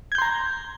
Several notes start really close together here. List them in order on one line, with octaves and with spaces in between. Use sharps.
G#6 G6 C6 A#5